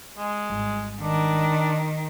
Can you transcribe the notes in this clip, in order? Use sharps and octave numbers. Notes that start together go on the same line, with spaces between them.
G#3
G#1 G3
D#3 D4